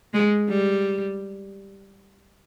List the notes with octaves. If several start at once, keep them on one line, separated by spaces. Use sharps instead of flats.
G#3
G3